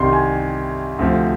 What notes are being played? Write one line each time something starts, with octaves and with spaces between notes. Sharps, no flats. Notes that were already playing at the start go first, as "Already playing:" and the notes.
Already playing: C2 C3 D#3 G3 C6
G#5
D2 C3 F3